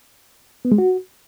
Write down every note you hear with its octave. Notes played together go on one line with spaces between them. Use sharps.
B3
G#3
F#4